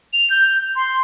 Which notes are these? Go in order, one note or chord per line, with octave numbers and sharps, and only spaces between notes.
F7
G6
C6